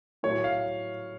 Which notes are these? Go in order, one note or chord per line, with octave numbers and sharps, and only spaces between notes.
A2 F#3 C#5
F5